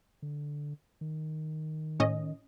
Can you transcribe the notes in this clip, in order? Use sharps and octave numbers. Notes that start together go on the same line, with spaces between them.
D3
D#3
A2 C#4 D#5